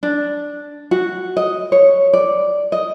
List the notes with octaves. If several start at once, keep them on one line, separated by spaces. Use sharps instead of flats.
D4
F#4
D#5
C#5
D5
D#5